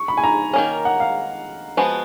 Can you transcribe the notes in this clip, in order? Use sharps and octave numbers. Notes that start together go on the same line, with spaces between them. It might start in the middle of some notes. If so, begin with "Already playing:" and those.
Already playing: C#6
B5
G#5
A#5
D#3 A#3 C#4
F#5
F5
F3 G#3 B3 F#4